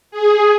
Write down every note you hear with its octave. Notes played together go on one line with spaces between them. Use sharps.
G#4